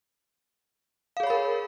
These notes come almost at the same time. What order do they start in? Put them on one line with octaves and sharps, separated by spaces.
F5 G#4 C#5 B5 A#4